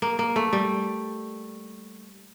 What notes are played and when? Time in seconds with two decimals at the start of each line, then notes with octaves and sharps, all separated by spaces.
0.02 A#3
0.19 A#3
0.36 A3
0.53 G3